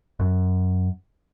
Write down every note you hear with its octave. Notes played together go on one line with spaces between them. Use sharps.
F#2